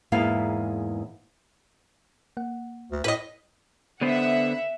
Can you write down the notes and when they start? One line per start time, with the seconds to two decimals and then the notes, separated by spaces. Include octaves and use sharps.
0.12 E2 G#2 A#3 B3 E4 F5
2.37 A#3 F#5
2.92 D2
3.04 A2 B4 D#5
4.01 D3 B3 C5 E5 F#5